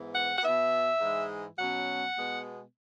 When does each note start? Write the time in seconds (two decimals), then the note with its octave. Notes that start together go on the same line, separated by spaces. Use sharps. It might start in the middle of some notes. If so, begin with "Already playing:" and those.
Already playing: G#2 E3 B3
0.13 F#5
0.38 F#5
0.42 B2 B3 E5
1.00 G#2 E3 G#3
1.58 B2 F#3 C#4 F#5
2.16 B2 G#3 B3